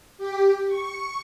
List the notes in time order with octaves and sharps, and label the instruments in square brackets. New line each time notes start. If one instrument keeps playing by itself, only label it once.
[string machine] G4
C#6